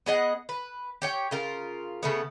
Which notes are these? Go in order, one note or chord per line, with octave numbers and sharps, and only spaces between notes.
B3 G#4 D#5 F#5
B4
G4 C#5 G5
C#3 F4 A#4
C#3 A3 B3